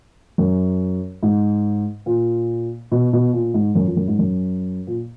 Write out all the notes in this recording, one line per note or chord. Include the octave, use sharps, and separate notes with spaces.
F#2
G#2
A#2
B2
B2
A#2
G#2
F#2
F2
F#2
G#2
F#2
A#2